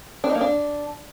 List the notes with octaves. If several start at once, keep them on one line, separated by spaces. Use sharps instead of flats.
D4
D#4
A#3
D4